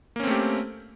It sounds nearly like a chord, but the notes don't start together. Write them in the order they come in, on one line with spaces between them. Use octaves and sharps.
A#3 C#4 C4 A3 G4